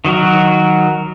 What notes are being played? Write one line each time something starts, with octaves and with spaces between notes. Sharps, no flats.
D#3 F#3 F#4 A#4